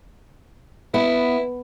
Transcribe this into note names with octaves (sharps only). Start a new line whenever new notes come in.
B3 E4